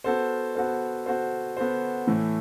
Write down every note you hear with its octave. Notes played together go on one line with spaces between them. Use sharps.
B3 F#4 A4 C5
B3 F#4 A4 C5
B3 F#4 A4 C5
B3 F#4 A4 C5
A2 E3 A3